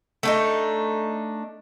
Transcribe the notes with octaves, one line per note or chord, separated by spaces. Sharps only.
A3 D4 D#4